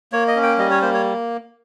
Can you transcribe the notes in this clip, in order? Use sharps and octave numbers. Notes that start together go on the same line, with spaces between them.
A#3 C#5
D#5
C#4
G5
G3 D#5
C#5
A#3 C5
C#5